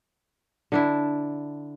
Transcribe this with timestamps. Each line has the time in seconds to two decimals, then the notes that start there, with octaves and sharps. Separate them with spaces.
0.72 D3 D4 E4